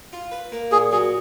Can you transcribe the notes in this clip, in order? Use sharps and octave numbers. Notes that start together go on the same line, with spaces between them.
F4
B4
A#3
A#2 G#4
F#3 G#4